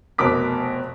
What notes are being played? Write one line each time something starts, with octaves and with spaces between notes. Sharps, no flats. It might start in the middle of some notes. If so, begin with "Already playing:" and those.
F1 B2 A#4 D6 B6